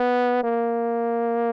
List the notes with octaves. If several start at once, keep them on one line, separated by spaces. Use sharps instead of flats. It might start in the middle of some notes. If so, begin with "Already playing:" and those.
Already playing: B3
A#3